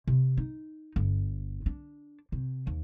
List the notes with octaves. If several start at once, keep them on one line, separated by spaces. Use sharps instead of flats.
C3
D#4
G1
D4
C3
D#2